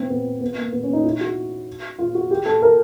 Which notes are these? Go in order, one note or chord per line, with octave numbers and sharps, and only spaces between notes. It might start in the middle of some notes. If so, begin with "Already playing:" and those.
Already playing: B3 C4
B3
B3
A#3
B3
C#4
D#4
E4
F#4
F4
F#4
G4
A4
A#4